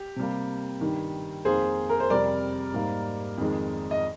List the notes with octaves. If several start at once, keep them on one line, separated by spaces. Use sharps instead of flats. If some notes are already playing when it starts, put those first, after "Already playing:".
Already playing: G4
C3 G3 A#3
G2 D#3 G3
F2 D#3 A#3 G#4 C5
A#4
C5
F2 C3 G3 A#4 D5
G#2 G3 A#3
F2 D#3 G#3
D#5